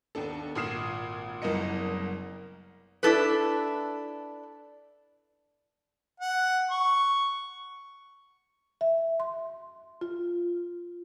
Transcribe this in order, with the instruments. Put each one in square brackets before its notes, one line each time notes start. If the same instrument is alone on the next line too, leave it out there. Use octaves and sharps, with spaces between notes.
[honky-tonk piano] D#2 B3 D4 A4
G#1 A#2 D#6 F6 C7 E7
F#1 C2 B3 A#4 D#5 C#7
[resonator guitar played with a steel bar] D4 E4 A4 B4
[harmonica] F#5
C#6
[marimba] E5
C6
F4